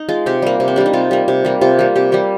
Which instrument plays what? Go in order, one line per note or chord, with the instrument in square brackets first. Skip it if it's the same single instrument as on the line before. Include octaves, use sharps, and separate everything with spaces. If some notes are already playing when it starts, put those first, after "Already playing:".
Already playing: [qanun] D#4
G#3 F4
C3 G4
G3 A#3
C3
C4
G3 A#3 D4
D#4
C3 F4
G3 A#3
C3
G3 A#3
C3 F4
G3 A#3
C3 G4
G3 A#3 G4